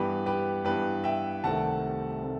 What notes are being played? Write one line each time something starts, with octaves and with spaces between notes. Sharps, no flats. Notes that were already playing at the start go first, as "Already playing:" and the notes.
Already playing: G2 E3 B3 G4 B4
G4 B4
G2 E3 B3 G4 B4
E5 G5
C2 C3 D#3 A3 C4 F#5 A5
C3 D#3 A3 C4